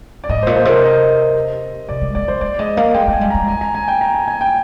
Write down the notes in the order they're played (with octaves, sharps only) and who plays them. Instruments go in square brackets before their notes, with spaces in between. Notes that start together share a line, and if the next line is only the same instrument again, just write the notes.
[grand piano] D5
[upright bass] G#2 [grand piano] D#5
[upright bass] A#2 [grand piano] C5
[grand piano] C5
[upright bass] C3 [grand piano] A#4
[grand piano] D#5
[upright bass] C3 [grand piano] D5
[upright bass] G#3
[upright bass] A#3 [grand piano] D5
[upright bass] G#3 [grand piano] C5
[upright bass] A#3 [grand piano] D5
[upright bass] G#3 [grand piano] D#5
[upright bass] A#3 [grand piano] F5
[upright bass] G#3 [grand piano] G5
[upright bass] G#3
[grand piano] G#5
[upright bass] G3
[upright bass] G#3 [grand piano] A#5
[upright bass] G#3 [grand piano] G#5
[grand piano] A#5
G#5
G5
A#5
G#5
G#5
G5